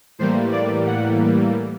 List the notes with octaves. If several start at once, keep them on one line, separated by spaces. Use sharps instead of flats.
A2 E3 G3 A#3 C5
D5
F#5